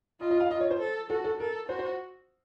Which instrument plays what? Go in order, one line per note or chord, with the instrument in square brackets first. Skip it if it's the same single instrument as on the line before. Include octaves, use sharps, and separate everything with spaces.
[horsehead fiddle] F4 [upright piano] D#5
[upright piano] D#5
F5
[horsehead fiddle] F4 [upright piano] D#5
[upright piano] C#5
C5
[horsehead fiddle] A4
[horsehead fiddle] F#4 [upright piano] A4
[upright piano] A4
[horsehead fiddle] A4 [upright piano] A#4
[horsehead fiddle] F#4 [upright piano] C5
[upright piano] C5